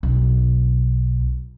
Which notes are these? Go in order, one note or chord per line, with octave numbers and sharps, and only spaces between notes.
B1